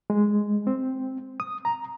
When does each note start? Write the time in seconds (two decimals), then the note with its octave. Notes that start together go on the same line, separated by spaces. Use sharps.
0.10 G#3
0.67 C4
1.40 D#6
1.65 A#5